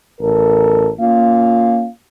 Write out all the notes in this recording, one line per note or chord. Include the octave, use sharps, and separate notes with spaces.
A1 A4 A#4
A#3 C#4 F4 F5